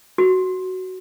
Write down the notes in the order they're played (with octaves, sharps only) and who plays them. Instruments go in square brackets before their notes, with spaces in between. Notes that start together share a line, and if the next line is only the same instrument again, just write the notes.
[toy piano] F#4